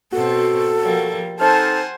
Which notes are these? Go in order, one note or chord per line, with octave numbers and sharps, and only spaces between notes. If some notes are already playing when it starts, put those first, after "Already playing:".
B2 C4 F#4 A4
F3 G3 A#3
C4 D#4 A4 C5 F#5 G#5 A5 F6